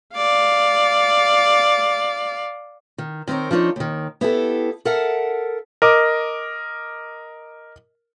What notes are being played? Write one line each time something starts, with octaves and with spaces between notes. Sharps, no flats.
D5 F5
D#3
D#3 C4 E4 A#4 C#5
F3 D4 D#4 C#5
D#2 D#3
B3 E4 G4 A4
A4 A#4 E5 F#5 A5
A#4 D#5 D6